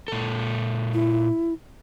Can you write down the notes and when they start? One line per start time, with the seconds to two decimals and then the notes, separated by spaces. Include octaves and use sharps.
0.08 A#2 A4
0.94 E4